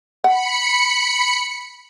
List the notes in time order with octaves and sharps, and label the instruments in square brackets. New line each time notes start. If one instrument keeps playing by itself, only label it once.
[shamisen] F#5 [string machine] B5 C#7